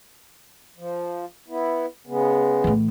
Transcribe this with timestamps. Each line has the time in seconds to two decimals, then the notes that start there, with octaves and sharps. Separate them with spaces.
0.77 F3
1.48 B3 E4
2.07 C#3 G#3 B3
2.64 A2 E3